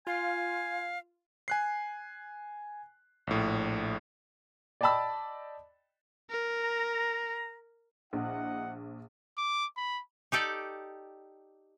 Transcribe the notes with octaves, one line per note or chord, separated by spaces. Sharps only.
F4 F5 G#5
G#5 F#6 C7
A#1 A2
D5 D#5 G5 A5 B5 E6
A#4
A#5
A#1 E4 D#5 F#5
D6
B5
D#4 G4 A4 D5